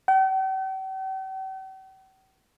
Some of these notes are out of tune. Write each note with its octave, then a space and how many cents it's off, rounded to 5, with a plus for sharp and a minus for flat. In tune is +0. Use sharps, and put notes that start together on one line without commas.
G5 -45